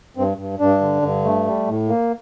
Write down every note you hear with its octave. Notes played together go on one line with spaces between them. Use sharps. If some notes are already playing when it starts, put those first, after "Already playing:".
G2 C4
G2
G2 D4
D3
G2
A3
G3
A2
A#3